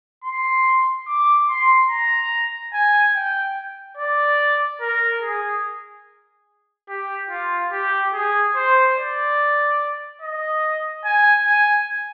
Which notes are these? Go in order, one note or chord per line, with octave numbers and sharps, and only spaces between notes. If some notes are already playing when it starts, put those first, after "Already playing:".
C6
D6
C6
A#5
G#5
G5
D5
A#4
G#4
G4
F4
G4
G#4
C5
D5
D#5
G#5
G#5